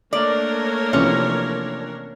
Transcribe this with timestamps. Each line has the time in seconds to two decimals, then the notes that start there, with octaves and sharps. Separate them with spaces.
0.13 A3 A#3 D4 A#4 C#5 D5
0.93 C3 E3 F3 C#4